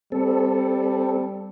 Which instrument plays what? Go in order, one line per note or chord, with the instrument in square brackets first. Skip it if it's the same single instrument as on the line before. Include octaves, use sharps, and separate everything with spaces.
[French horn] G3 [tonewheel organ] C4 A4